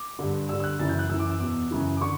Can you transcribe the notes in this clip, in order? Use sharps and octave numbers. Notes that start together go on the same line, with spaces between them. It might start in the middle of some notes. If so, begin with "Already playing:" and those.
Already playing: D6
G2 D3
G2 D3 E6
E6
F#6
F#2 C#3 E3 A6
G6
F#6
F#2 E3 E6
D6
E6
E2 B2 D6
F#2 C#3 E3
D6
D3 C#6